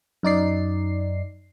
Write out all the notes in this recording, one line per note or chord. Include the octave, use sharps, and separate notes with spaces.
F#2 D#4 D5 C7